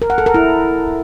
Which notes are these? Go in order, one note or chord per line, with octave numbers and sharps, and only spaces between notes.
A#4
F#5
A4
A#4
E4